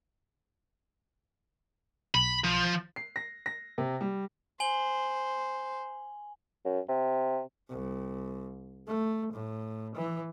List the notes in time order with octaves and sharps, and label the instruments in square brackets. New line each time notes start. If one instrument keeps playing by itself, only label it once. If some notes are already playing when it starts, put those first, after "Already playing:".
[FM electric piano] B1 [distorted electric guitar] B5
[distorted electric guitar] F3
[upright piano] C7
A#6
A#6
C3
G3
[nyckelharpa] C5 [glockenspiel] G#5 F#7 G7
[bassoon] F#2
C3
[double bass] C2
A3
A2
E3